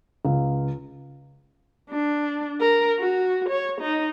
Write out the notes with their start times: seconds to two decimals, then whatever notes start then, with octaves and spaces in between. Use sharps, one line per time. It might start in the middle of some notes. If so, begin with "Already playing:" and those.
0.25 C#2
1.90 D4
2.61 A#4
2.99 F#4
3.49 C#5
3.81 D#4